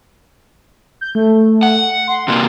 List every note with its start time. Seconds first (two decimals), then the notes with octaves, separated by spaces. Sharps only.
1.01 G6
1.15 A3
1.63 F#5
2.07 C6
2.28 C3 A#3